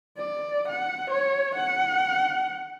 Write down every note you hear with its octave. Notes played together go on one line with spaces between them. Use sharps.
D5
F#5
C#5
F#5